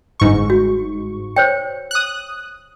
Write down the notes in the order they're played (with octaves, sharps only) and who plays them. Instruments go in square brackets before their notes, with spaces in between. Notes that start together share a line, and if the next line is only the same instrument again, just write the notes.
[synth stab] G1 G#2 C#6
[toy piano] F#4
C5 C#5 G5
[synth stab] D#6 F#6